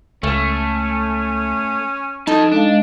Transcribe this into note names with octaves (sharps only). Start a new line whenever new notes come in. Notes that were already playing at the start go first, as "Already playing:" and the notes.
C#2 A3 C#4
F2 D#4 A4 A5
G#3 D4 D#5 F5